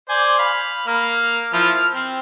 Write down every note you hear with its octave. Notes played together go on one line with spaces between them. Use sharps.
C5 D5 G#5
F5 B5
A#3 F6
F3 E4 F6
F6
C4